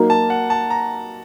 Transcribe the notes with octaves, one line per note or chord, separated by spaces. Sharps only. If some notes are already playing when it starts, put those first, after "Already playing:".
Already playing: F#3 A#3 D#4 A#4
A5
F#5
A5
A#5